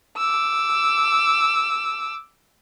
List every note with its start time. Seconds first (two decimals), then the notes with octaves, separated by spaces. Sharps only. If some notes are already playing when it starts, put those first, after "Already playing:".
0.18 D6 E6